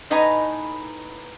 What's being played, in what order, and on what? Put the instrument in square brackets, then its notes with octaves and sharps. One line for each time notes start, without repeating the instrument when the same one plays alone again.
[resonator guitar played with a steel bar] A2 D#4 B4 D#5 G#5 A#5